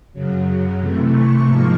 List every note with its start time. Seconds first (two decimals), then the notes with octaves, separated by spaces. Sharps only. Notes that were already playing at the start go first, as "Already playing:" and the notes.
0.13 F#2 C#3 F#3
0.79 C3 E3 A3
1.12 C#6
1.45 G#2 F3 A#3